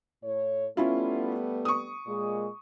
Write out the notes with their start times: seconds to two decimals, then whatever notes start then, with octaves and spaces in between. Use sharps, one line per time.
0.23 A2 C#5
0.77 G3 A3 B3 C#4 E4 F4
1.65 C#6 D#6
2.06 A#2 G#3